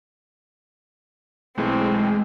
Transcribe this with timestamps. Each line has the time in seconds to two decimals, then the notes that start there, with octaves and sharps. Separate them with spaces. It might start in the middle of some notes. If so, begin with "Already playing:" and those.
1.58 B1 E3 G#3 A3 C4